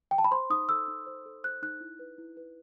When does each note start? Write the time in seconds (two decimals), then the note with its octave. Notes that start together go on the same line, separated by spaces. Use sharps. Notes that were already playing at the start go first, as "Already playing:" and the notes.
0.11 G5
0.18 A5
0.24 B5
0.31 C5 C6
0.50 D#4 D#6
0.69 A4 E6
0.88 D#4
1.07 C5
1.26 A4
1.44 C5 F#6
1.62 D#4 F#6
1.81 E4
1.99 B4
2.18 E4
2.37 B4